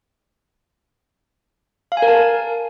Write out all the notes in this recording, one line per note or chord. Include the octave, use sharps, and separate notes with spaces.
F5
G#5
A#4
A5